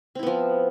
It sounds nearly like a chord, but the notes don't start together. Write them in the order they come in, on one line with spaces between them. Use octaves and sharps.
C4 E4 B3 F3